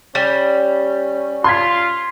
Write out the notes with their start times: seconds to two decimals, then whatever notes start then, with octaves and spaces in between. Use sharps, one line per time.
0.15 G3 C#4
1.44 F4 C6 G#6 B6